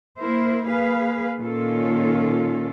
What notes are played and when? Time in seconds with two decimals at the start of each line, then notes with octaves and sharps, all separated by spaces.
0.19 A#3 E4 A#4 C5
0.65 A#3 G#4 B4 F5
1.38 A#2 D#3 A#3 C#4 F4 A4